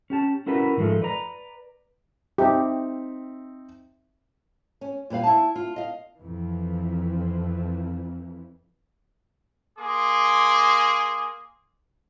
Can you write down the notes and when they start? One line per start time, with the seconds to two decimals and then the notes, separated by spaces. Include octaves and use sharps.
0.10 C#4 G4 A5
0.46 C#4 E4 F#4 A#4 B4
0.77 G#2 D#3 F3 G#3 A3
1.02 B4 D5 A#5
2.38 C4 D#4 G4 E5
4.81 C#4
5.10 A#2 G3 B4 F5
5.23 E4 A5
5.56 F4
5.76 D#5 F5
6.19 F2 E3
9.79 A#3 G#4 C6 D6